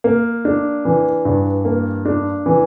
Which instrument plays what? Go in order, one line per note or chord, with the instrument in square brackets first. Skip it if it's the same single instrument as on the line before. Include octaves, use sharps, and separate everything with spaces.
[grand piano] A#3
D4
E3
G2
A#3
D4
E3